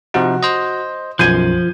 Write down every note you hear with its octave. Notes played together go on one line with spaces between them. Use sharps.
C3 F3 D#4 F#4
C5 D#5
B1 F#2 F3 G6 G#6 D#7